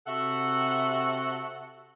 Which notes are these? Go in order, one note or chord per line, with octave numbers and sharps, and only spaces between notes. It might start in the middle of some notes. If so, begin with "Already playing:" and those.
C3 F#4 A4 E5 F#5